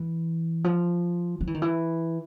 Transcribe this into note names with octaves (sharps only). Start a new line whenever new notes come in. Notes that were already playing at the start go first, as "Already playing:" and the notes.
Already playing: E3
F3
F3
E3
D#3
E3